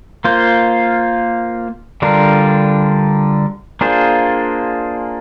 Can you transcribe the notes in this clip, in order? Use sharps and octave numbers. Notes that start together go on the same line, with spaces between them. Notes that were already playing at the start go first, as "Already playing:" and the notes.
A#3 F4 C5
D3 G3 D4 F4 A#4
A#3 D4 F4 G#4 C5